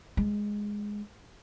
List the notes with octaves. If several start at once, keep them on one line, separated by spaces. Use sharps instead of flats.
G#3